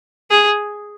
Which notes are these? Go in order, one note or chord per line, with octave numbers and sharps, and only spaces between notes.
G#4